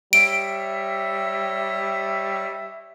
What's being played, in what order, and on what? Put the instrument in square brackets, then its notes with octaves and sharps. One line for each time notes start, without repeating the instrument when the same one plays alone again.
[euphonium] G3 [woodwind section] C#5 D#5 E5 [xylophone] D7